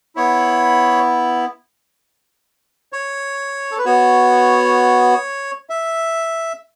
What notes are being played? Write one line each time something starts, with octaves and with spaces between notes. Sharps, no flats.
B3 E4 C#5
C#5
A4
B4
B3 F#4 C#5
E5